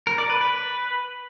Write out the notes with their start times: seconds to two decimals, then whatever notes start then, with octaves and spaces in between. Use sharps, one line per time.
0.07 A#4
0.18 D5
0.30 B4
0.41 B4